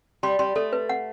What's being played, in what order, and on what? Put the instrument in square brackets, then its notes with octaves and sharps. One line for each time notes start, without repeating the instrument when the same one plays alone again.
[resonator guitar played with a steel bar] G3 [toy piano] C6
[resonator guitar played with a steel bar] G3 [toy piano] C6
[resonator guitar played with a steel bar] A3 [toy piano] A4
[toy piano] B4
F#5